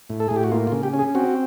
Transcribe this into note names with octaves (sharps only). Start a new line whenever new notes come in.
A2
A4
A2 G#4
G4
F#4
A#3 F4
F4
C#3
G4
C#4
G#4
C4 F#4